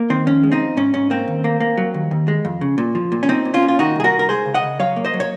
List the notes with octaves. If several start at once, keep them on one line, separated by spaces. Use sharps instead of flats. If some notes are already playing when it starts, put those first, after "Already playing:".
Already playing: A#3
D#3 C4
F2 C#4
G#3
C4 D#4
F2
G#2 C#4
G#2 C#4
A#3 C4
D#2
A#3
A#3
F#3
D#2
D#2
G#3
F2
C#3
A#2
F3
A#2
C#4
A#2 C4 D#4
A#2
C#4 F4
A#2
F4
D#3 D#4 F#4
C2 G#4
F#4 A#4
C2
A#4
G#3 G#4 C5
C#3
D#5 F#5
C#3
F#3 C#5 F5
A#3
C5 D#5
F#3
C#5